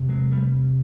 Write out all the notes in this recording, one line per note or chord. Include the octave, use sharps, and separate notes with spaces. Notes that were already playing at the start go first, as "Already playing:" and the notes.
Already playing: E2 C3
F#3 G#3
G3 A3